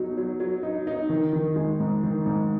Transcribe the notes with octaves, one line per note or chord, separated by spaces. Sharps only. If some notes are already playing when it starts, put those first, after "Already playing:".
Already playing: B2 F#3 D#4
F#3
F#3
D#4
D#4
D#3
D#3
G#3
G#2
D#3
G#2